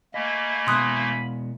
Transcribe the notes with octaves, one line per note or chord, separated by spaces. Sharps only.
A3 A#3 D#5 F5 G#5 B5
B2 G#3 B3 C6 D#6 F#6